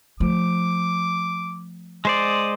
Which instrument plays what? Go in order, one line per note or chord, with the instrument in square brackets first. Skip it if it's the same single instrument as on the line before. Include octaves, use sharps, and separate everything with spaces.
[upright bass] F3 A3 [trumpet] D6
[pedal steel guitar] G#3 C5 D5 [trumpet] D#6